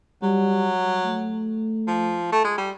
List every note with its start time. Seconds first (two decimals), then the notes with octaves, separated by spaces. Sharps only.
0.22 F#3 G3
1.05 A3
1.88 F3
2.32 A3
2.45 G#3
2.58 G3